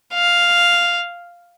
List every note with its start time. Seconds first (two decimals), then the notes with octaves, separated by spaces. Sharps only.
0.14 F5